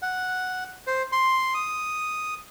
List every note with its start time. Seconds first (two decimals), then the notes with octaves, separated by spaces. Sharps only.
0.02 F#5
0.87 C5
1.12 C6
1.55 D#6